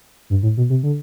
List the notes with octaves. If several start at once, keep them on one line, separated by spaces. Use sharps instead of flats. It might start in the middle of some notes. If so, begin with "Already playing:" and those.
G2
A2
B2
C3
D3